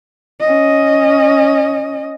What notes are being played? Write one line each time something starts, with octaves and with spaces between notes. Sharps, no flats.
C#4 D#5